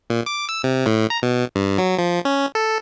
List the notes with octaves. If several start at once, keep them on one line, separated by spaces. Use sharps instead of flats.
A#2
D6
E6
C3
A2
A#5
B2
G2
F#3
F3
C#4
A4